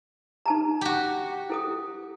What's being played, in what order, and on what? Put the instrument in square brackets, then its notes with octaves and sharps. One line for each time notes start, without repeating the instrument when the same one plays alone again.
[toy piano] D#4 A5 A#5
[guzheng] F#4 G4
[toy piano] E4 A4 D#6